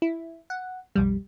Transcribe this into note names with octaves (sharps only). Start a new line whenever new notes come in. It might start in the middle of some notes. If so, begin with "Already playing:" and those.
E4
F#5
B1 F2 G3